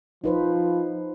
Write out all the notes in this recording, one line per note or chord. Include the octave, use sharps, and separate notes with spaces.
F3 D#4 B4 C5